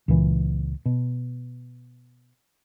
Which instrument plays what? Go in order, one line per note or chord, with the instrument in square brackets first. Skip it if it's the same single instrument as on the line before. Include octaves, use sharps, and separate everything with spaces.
[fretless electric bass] C#2 A#2 E3
B2